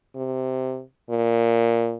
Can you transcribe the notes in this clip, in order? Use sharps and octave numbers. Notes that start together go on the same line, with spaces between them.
C3
A#2